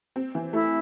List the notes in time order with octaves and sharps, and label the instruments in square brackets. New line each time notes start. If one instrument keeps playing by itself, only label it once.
[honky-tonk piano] C4
E3
[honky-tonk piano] A3 [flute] E4